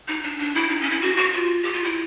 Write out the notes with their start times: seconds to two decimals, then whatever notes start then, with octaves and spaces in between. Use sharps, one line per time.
0.08 D#4
0.23 D4
0.39 D4
0.55 E4
0.70 D#4
0.81 C#4
0.91 E4
1.01 F#4
1.17 F#4
1.33 F4
1.63 G4
1.73 F4
1.84 E4